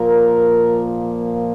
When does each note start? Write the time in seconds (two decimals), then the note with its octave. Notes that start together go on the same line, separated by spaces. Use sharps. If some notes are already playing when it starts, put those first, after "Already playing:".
Already playing: A#2 F3 A#3 A#4